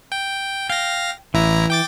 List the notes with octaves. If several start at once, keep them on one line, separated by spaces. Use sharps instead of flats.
G5
F5 G5 A#6
A1 E3 E4 A#5
G5 D6 A6